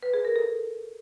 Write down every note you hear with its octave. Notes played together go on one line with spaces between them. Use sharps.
B4
G#4
A#4
A4